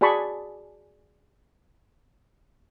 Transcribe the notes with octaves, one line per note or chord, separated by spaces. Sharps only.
F#4 G#4 D5 A5 B5 C#6